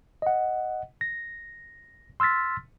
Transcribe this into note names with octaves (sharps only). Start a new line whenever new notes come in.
D#5 F#5
A#6
C6 E6 F6 A6 B6